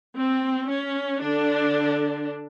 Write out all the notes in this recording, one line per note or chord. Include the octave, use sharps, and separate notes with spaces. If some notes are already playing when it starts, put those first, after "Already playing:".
C4
C#4
D3 D4